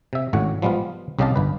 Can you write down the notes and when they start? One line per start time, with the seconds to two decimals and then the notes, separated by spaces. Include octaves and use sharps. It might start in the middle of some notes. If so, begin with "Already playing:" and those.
0.13 C3 E5
0.33 G#1 A2 C#3 F#4 F#5
0.62 F3 G3 G#3 B3 F4
1.19 C2 C#3 G4 D#5 F5 A5
1.36 G1 B4